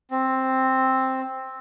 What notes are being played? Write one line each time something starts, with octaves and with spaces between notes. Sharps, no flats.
C4